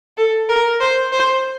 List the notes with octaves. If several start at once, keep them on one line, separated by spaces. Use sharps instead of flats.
A4
A#4
C5
C5